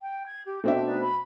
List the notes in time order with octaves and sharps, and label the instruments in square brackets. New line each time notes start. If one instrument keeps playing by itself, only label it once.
[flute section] G5
G#6
G4
[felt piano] B2 E5 [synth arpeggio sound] A3 C4 D4 [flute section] G5
[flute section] D#4 B4 D5
B5